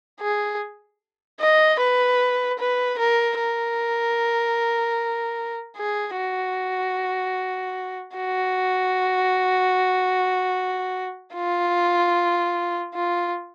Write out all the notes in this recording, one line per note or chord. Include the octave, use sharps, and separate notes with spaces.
G#4
D#5
B4
B4
A#4
A#4
G#4
F#4
F#4
F4
F4